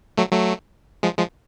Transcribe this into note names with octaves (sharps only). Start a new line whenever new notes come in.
F#3 A3
F#3 A3
F3 G#3
F3 G#3